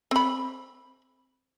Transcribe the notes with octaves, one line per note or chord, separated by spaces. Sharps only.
C4 B5